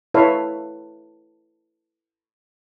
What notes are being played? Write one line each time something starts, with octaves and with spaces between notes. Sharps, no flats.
E4 A4 B4 C#5 E5 F5